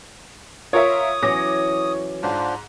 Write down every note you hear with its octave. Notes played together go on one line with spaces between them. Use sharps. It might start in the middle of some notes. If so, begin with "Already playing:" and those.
F4 A#4 C#5 E5 D#6
E3 F#3 C#4 D6 A#6
G#2 D4 F4 C5